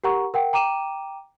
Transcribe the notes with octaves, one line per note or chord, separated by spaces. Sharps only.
G4 A#4 F#5 A#5 C#6
A#4 F#5 G5
G5 A#5 D6 D#7 E7